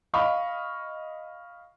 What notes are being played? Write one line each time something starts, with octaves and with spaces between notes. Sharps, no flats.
D#5 F5 B5 C#6